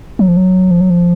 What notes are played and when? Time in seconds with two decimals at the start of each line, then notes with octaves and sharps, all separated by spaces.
0.19 F#3
0.28 F3
0.37 F#3
0.71 F3
0.81 F#3
0.90 F3